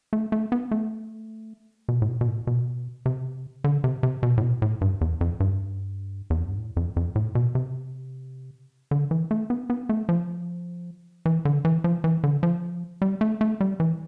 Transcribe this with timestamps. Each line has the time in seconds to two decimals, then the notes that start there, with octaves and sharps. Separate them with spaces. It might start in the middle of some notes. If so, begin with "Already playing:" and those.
0.13 A3
0.32 A3
0.52 B3
0.71 A3
1.88 B2
2.02 A2
2.08 B2
2.21 B2
2.28 A2
2.47 B2
3.06 C3
3.64 D3
3.84 C3
4.03 C3
4.23 B2
4.38 A2
4.42 B2
4.62 A2
4.81 G2
5.01 E2
5.21 F2
5.40 G2
6.30 E2
6.39 F2
6.48 G2
6.58 A2
6.77 F2
6.96 F2
7.16 A2
7.35 B2
7.55 C3
8.91 D3
9.11 E3
9.31 A3
9.50 B3
9.70 B3
9.89 A3
10.09 F3
11.25 E3
11.45 D3
11.65 E3
11.84 F3
12.04 E3
12.24 D3
12.43 F3
13.02 G3
13.21 A3
13.41 A3
13.60 G3
13.80 E3